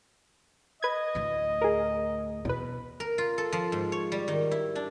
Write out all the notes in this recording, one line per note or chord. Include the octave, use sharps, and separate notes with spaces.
B4 D#5 G#6
D2 A2
G#4 A#4
E2 B2 B4
A#4
F4
A4
F3
G#2
C#5
G3
D#3
E4
D4